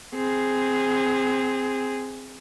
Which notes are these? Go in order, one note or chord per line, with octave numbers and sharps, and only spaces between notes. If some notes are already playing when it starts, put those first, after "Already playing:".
C4 G#4